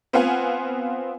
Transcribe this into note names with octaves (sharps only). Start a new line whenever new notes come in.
B3 C4 F4 F5 F#5 G#5